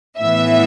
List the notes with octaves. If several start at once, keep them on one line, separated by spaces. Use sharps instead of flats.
A2 E3 B3 E5